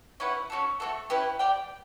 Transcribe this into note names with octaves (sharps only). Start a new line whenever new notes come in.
C#4 E4 B4 F#5
C#4 F#4 A4
A3 D4 F#4 A4
C#4 E4 G4 B4
G4 D5 G5